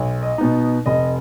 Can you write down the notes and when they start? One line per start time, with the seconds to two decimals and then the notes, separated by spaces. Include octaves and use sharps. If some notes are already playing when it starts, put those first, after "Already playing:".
Already playing: B1
0.23 D#5
0.38 B2 B3 D#4
0.86 F1 D#5